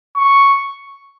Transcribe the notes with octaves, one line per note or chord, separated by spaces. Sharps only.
C#6